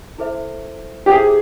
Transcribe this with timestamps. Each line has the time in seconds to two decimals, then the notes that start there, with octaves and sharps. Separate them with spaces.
0.18 E4 A4 C5 E5
1.06 G4
1.11 E4 G#4 A4 C5 E5